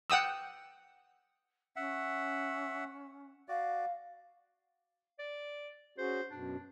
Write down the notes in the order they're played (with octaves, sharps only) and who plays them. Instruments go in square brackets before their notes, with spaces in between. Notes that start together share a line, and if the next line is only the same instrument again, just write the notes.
[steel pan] F#5 G5 D#6 E6
[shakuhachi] C#4 [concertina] E5 F#5
[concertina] F#4 D5 [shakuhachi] F5
[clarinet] D5
[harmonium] C#4 F#4 G#4 [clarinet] C5
[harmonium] F#2 B2 [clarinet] D4